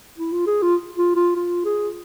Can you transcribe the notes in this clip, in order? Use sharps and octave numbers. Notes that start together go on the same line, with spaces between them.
E4
F4
G#4
F4
F4
F4
F4
G#4